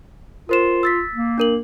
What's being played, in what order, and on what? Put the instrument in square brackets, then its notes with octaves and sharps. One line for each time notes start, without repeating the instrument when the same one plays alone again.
[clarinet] F4 [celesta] A#4 C5 E7
[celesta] E6 A6 B6
[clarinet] A#3
[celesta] D4 A#4 F#7